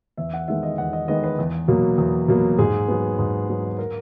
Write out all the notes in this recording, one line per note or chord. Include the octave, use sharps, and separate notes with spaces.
E2 E5
F#5
D#3 G#3 B3 E5
D#5
E2 F#5
D#5
D#3 G#3 B3 D#5
B4
E2
B2 F#3 A#3
E2
B2 F#3 A#3
G#2 G#4
F#3 B3
G#2
F#3 B3
A#4